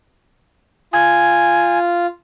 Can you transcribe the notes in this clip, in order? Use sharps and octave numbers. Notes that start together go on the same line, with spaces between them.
F4 G#5